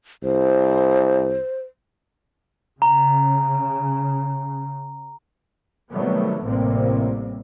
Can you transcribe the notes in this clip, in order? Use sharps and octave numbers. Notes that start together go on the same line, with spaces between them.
C2 C5
C#3 A#5
C3 D#3 F#3 G3 A3 B3
A1 A2 C3 G3 A#3 C4